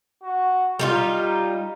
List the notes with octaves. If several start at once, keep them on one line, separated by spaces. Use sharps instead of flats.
F#4
G3 D#4 F4 G4